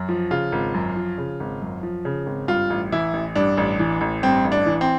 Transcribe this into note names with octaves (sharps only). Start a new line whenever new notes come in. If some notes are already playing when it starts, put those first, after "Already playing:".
Already playing: F#2
F3
C#3 F4
G#1
F#2
F3
C#3
G#1
F#2
F3
C#3
G#1
G2 F4
A1
E3 E4
A1
G2 D4
A1
E3
A1
G2 C4
A1
D4
E3
C4